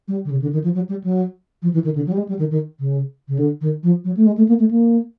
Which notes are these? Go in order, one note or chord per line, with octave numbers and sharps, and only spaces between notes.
G3
D3
C#3
D3
D#3
F3
F#3
G3
F#3
F3
E3
D#3
D3
F#3
G3
G#3
G3
D#3
D#3
C#3
C#3
D3
D#3
F3
F#3
A3
G#3
A3
A#3
A3
A#3